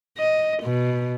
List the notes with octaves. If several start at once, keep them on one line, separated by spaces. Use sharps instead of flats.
D#5
B2